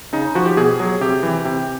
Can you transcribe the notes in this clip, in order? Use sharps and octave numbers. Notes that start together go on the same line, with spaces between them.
C#3 D#4
F3 F#4
G4
B2 G#4
F#3
C3 G4
E3
C3